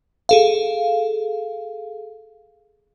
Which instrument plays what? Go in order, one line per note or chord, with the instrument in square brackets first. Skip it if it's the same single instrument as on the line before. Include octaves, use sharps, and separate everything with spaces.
[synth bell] G#4 A4 F5